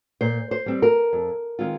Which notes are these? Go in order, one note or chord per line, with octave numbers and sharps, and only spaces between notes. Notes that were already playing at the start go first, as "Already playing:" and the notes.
A#2 C5
C5
G3 C4
A#4
F2
D#3 G#3 C4 F4